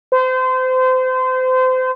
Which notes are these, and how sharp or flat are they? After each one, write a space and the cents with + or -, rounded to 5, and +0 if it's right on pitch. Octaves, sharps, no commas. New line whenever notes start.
C5 -30